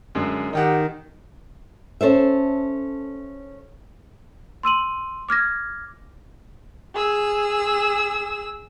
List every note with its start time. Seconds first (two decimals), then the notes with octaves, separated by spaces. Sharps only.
0.15 F#2 D3 G#3
0.53 D#3 D#4 G4 F#5
2.01 C#4 A4 C5 E5
4.63 C6 E6 D#7 F#7
5.29 D6 F6 G#6 A#6
6.95 G#4 E6